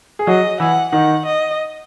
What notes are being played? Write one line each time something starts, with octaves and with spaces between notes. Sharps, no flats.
G#4
F#3 F#4 D#5
E3 E4 F#5
D#3 D#4 F#5
D#5